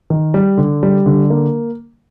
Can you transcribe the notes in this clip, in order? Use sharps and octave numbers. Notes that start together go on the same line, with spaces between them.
D#3
G3
D3
G3
D3
A#3